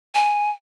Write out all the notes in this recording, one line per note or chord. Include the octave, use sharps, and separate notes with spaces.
G#5